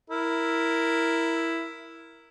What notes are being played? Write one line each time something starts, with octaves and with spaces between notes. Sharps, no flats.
E4 A#4